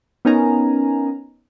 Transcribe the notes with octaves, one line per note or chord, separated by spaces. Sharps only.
B3 C#4 D#4 A#4 G#5 A#5